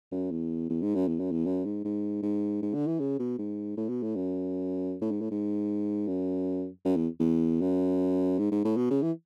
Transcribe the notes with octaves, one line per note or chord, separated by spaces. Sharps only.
F#2
E2
E2
G#2
F#2
E2
F#2
E2
F#2
G#2
G#2
G#2
G#2
D3
E3
C#3
B2
G#2
A2
B2
A2
F#2
A2
G#2
A2
G#2
F#2
F#2
E2
E2
F#2
G#2
G#2
A2
B2
C#3
E3